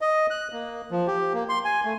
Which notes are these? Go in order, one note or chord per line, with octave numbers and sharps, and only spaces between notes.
D#5
F#6
A#3
F3
G4
A#3
C6
G#5
A3